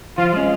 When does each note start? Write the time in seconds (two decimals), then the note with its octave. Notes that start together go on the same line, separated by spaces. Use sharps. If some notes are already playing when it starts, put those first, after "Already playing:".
0.18 F3 F4
0.33 G#3 C#4